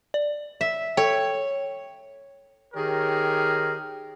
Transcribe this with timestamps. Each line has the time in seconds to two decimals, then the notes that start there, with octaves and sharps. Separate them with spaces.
0.14 D5
0.61 E5
0.97 A4 C#5 G5
2.74 D#3 G4 G#4 A#4 C#5